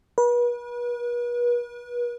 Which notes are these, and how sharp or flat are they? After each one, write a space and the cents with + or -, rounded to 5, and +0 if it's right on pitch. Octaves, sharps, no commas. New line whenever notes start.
B4 -40